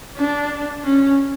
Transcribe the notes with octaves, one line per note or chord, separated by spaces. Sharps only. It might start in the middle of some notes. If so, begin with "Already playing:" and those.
D4
C#4